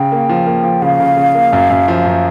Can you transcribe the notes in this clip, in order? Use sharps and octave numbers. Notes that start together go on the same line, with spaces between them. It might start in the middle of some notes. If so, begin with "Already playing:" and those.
Already playing: C#3 G5
A#3
F3
A#3
F3
C#3 F5
C#3
C#3
A#3
F#2
F#2
F3
F#2